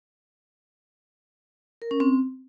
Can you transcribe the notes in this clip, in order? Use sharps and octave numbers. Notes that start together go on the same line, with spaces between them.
A#4
C#4
C4